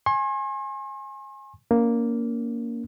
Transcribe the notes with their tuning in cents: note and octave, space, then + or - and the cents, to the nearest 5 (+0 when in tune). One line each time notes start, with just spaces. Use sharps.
G#5 +0 C6 +45
A#3 +0 C#4 +45